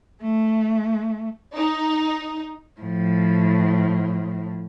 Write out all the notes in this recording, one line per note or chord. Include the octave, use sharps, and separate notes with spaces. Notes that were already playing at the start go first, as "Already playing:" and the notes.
A3
D#4
A2 F3